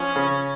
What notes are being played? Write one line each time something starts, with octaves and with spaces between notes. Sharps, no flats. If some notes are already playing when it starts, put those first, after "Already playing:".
Already playing: F3 C#4
C#3